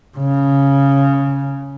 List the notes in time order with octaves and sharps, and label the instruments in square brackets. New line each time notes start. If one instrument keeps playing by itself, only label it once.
[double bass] C#3